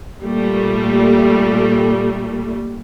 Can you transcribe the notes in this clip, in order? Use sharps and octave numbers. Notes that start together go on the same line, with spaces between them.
A#2 G3 A3